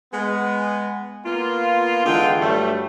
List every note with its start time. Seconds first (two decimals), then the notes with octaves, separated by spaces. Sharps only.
0.14 G#3 B3
1.26 A#3 B3 F4
2.06 D3 E3 G#3 F4 G5
2.41 G2 F#3 G3 A3